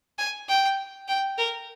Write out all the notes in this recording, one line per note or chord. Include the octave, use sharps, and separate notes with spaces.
G#5
G5
G5
A#4